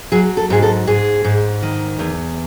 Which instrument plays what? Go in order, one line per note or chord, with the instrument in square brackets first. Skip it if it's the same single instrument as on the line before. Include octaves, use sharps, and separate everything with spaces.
[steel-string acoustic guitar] F#3 G#4
A4
G#2 G#4
A4
G#2 G#4
G#2
D#3
E2